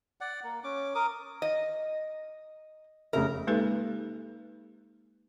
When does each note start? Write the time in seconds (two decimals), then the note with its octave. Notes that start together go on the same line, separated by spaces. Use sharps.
0.21 D5 F#5
0.44 A#3
0.64 C#4 D6
0.95 A#4 D6 D#6
1.42 D#5
3.13 F1 C#3 A#4 E5
3.47 G#3 A#3 D#4 G4 A4 B4